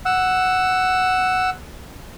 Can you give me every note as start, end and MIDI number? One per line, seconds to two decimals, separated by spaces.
0.06 1.50 78
0.06 1.50 88